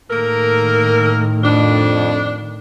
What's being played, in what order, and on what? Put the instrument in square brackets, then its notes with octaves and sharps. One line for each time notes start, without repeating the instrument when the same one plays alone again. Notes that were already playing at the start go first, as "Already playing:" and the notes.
[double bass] A2 D#3 [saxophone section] A#3 A4 A#4
[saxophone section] F2 D4